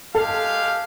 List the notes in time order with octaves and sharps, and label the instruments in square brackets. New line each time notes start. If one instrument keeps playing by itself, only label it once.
[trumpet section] G#3 G4 F5 [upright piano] A4